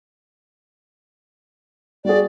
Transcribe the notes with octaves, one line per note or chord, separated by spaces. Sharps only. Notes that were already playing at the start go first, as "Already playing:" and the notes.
G3 F#4 G#4 D5